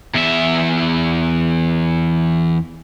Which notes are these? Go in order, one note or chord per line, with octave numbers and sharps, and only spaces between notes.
E2 E5